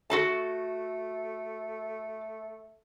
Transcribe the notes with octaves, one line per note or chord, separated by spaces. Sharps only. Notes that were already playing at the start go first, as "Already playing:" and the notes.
A3 F#4 A4 A5